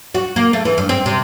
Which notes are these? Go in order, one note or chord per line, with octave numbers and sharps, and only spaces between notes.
F#4
A#3
A3
E3
G2
C4
C3